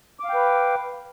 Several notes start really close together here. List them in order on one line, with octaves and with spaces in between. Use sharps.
D6 F5 G5 B4